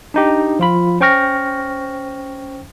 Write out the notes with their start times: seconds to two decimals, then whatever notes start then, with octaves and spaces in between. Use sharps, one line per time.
0.14 D4 D#4 G4
0.59 F3 F4 B5
1.00 C#4 C5 G5 C#6 F6 A#6